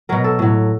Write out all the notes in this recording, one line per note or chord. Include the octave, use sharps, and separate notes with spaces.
B2 F#3 A#4
A4
A2 F#3